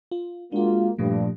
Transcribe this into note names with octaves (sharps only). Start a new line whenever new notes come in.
F4
G#3 A#3 D4 F4 F#4
G2 A#2 F3 A3